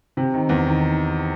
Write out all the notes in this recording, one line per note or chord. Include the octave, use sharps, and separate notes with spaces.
C3
D#3
E2
D#3